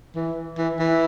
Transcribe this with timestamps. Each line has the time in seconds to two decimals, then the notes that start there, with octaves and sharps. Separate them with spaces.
0.16 E3
0.58 E3
0.79 E3